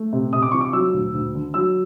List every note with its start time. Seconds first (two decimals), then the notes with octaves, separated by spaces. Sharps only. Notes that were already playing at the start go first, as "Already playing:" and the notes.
Already playing: A3
0.13 C3
0.33 C3 D#6
0.42 D6
0.51 F3 C#6
0.61 D6
0.73 F#3 E6
0.94 D2
1.14 D2
1.35 D3
1.54 F#3 E6